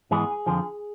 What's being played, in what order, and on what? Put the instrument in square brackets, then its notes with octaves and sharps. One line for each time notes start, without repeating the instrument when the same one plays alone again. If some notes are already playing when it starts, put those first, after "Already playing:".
[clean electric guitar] G#2 E3 G#3 B3 G#4
F2 D3 F3